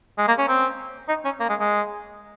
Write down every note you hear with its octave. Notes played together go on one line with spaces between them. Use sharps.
G#3
A#3
C#4
C4
D#4
C#4
A#3
G#3
G#3